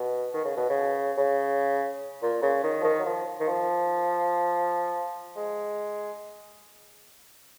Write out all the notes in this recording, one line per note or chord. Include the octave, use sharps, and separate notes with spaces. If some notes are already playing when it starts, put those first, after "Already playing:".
Already playing: B2
D#3
C#3
B2
C#3
C#3
A#2
C#3
D#3
F3
D#3
F#3
F3
D#3
F3
G#3